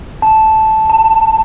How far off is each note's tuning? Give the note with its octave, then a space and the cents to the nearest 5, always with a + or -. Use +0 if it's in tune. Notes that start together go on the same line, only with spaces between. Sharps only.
A5 -5
A5 +25